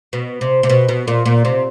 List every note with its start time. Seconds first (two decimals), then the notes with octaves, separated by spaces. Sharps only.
0.13 B2
0.41 C3
0.63 C3
0.70 B2
0.89 B2
1.08 A#2
1.26 A#2
1.45 C3